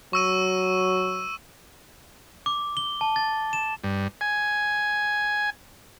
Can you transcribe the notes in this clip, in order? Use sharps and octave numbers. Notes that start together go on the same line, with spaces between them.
F#3 C#6 E6 D#7
D6
G7
A5
A6
E7
G2
G#5